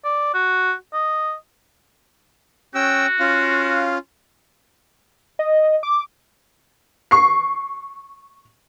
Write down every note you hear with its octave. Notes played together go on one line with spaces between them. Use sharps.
D5
F#4
D#5
C#4 F#4 G5 E6
C#4 F4 F5
D#5
D6
C#6 C7